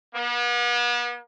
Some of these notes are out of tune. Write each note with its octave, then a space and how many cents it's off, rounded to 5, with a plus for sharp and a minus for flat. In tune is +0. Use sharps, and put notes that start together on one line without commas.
B3 -40